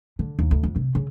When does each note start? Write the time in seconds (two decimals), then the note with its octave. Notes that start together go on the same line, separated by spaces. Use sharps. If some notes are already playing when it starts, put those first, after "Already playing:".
0.19 D3
0.39 D#2
0.51 D2
0.63 F2
0.76 C3
0.95 C#3